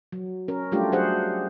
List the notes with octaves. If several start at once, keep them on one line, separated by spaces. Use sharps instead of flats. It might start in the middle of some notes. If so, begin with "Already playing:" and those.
F#3
C#4 A#4
F#3 G3 A3 D4 F4 G4
F#3 D4 G4 G#4 C5 F#5